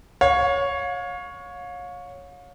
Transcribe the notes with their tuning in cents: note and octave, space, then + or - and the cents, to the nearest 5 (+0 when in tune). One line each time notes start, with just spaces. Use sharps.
C#5 +0 F5 +35